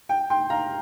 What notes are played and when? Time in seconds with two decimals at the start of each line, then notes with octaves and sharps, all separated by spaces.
0.09 G5
0.30 G5 C6
0.50 F5 A#5